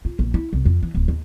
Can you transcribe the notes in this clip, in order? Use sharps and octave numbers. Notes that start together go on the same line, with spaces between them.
F4
A#1
E4
C2
F2
E3
D1
D#2